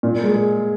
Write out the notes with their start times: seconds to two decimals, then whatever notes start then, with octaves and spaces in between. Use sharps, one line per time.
0.03 A#2
0.23 G#3